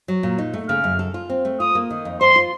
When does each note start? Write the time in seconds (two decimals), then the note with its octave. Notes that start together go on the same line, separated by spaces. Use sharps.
0.08 F#3
0.23 A#2
0.38 D#4
0.54 A3
0.69 C#3 F6
0.84 F#2
0.99 A4
1.14 F4
1.30 C4
1.45 A3
1.60 F4 D#6
1.75 A#3
1.90 D#3
2.05 F2
2.21 C5 C6
2.36 F4